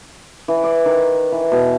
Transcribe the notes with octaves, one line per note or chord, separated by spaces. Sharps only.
E3
D5
D#3
E3
B2